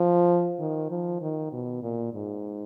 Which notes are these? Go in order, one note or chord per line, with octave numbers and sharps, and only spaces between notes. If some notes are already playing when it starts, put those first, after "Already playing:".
Already playing: F3
D#3
F3
D#3
B2
A#2
G#2